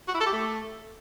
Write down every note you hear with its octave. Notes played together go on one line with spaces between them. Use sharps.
F#4
E4
A4
G4
A3